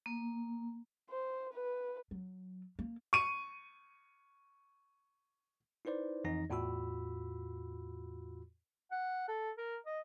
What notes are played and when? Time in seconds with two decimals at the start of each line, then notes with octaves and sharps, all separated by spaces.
0.06 A#3
1.10 C5
1.54 B4
2.11 F#3
2.79 A#3
3.13 C#6 D#7
5.85 D#4 E4 B4 C5 D5
6.24 F2 E3 D#4 A#6
6.50 E2 A2 F4 F#4 B5 E6
8.91 F#5
9.28 A4
9.58 A#4
9.86 D#5